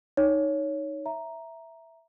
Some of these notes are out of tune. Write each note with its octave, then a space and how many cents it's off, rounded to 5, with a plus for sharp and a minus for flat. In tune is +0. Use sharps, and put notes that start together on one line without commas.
D#4 +0 C#5 +10
E5 +0 A#5 +0